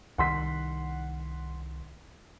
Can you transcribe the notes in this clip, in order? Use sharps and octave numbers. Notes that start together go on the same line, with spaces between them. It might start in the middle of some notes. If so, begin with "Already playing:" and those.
C2 D#3 F#5 C6 B6